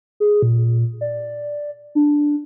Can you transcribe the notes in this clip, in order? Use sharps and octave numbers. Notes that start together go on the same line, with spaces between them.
G#4
A#2
D5
D4